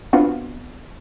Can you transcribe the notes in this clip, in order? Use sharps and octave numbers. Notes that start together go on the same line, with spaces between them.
B3 C4 D4 F4 F#4